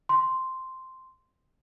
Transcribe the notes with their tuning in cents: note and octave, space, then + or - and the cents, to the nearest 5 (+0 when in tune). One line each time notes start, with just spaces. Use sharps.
C6 -5